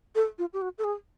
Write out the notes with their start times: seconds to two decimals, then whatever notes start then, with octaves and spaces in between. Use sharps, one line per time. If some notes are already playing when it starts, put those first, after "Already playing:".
0.15 A4
0.39 F4
0.53 G4
0.62 F#4
0.78 A4
0.84 G#4